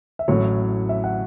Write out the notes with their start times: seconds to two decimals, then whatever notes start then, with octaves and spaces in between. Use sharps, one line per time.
0.19 E5
0.28 A1 A2 F#3 C#5
0.89 E5
1.04 F#5